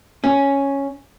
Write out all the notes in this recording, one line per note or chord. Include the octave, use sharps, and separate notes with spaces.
C#4